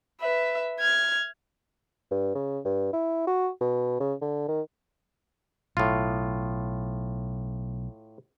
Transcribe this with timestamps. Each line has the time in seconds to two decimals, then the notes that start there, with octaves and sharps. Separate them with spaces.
0.20 B4 E5
0.80 F6 G#6
2.11 G2
2.35 C#3
2.65 G2
2.93 E4
3.27 F#4
3.61 B2
4.00 C#3
4.21 D3
4.48 D#3
5.77 B1 A2 F4